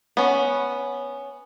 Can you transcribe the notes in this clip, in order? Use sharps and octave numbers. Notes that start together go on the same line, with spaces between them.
B3 C#4